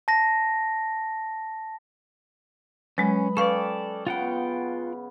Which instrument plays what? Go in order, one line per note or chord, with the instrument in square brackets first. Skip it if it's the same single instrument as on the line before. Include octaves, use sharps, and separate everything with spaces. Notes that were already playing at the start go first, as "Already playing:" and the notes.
[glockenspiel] A5 A#6
[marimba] F#3 G#3 [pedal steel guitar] C#4 [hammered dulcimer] B4 D#5
[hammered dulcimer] C#4 G5 [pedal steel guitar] A4 D5 [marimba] B4 F5 C#6
[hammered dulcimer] C#3 B3 [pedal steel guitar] F4 F#5 G5